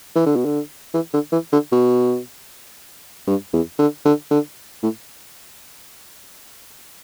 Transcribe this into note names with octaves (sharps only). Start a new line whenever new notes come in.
E3
D3
B2
D3
E3
D3
E3
D3
B2
G2
E2
D3
D3
D3
A2